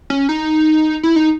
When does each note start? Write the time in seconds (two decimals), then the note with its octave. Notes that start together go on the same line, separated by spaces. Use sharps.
0.10 C#4
0.29 D#4
1.03 E4
1.16 D#4